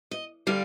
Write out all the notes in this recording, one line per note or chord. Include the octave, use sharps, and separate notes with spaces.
D#5
D3 G3 F5